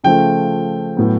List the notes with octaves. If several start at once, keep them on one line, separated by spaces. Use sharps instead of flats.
C#3 F3 A3 G5
A2 F#3 B3